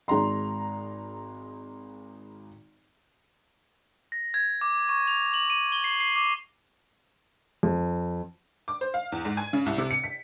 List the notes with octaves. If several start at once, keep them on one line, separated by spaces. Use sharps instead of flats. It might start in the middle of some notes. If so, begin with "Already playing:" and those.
G#1 G#3 A#5 C6
A#6
G#6
D6
C#6
F7
F#7
D#7
G7
C7
C7
D6
F2
D6
C5
F5
E2
G#2
G#5
C#3
C2
C3
C#7
B6